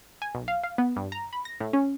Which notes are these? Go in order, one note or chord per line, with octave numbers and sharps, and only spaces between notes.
G#5
B1
F5
F5
B3
G2
A#5
B5
A#6
A2
C#4